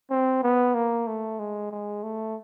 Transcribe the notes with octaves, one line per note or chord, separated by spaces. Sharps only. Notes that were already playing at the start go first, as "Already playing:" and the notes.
C4
B3
A#3
A3
G#3
G#3
A3